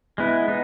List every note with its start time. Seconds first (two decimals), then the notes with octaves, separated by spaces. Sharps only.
0.18 G#3 B3 E4
0.48 B3 D#4